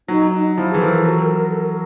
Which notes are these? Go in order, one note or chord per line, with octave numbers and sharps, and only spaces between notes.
F#3 D#4
D#4
F3 E4
G#4
E3
F3 A4
A#4
F#3 A4
A#4
A#4
A4
A#4